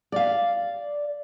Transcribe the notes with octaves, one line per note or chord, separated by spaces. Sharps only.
D5 F5